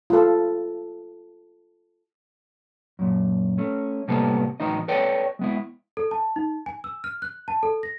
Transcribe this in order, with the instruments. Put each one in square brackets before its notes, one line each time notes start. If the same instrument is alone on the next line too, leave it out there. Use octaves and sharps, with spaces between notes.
[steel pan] F4 A4
[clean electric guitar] F#2 A#2
A3 C#4
A2 C3 G3 A#3 B3 A4
A2 E3 D#4 D#5
A4 B4 C#5 D5 G5
G#3 B3 E4
[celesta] A4
A5
D#4
G#5
E6
F6
F#6
A5
A4
A#6